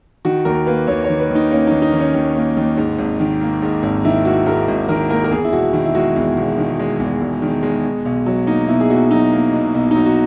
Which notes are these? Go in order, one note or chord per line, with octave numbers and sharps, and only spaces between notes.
D#3 F#4
D#2 A#4
A#3 B4
D#2 C#5
C#5
D#3
B4
D#2 D#4
A#3 C#4
D#2 D#4
D#4
D#3
C#4
D#2
A#3
D#2
G#2
G#1
D#3
A#3
G#2
G#1
D#3 E4
A#3 F#4
G#2 A#4
G#1
D#3 A#4
A#3 A#4
A#4
E2 G#4
E4
E1 F#4
D#3 E4
E4
G#3 F#4
E2
E1
D#3
G#3
E2
E1
D#3
G#3
B2
B1
F#3
A#3 D#4
B2 E4
G#4
B1 F#4
F#3 D#4
A#3
B2
B1
F#3 D#4
F#4